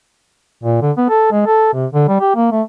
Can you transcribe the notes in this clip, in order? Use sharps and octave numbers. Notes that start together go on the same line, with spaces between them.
A#2
D3
B3
A4
G#3
A4
C3
D3
G3
G4
A#3
A3